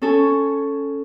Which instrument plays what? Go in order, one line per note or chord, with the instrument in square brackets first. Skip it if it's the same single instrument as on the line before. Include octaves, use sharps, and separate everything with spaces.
[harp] C#4 A4 G#5